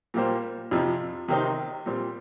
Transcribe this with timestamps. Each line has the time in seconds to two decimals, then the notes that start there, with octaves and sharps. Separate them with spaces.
0.14 A#2 G3 A#3 G4 C5
0.71 F2 C3 F3
1.28 C3 D#3 C4 D#4
1.86 A#2 G3 C4